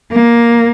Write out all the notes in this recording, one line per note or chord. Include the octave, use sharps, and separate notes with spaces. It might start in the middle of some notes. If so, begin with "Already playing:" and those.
A#3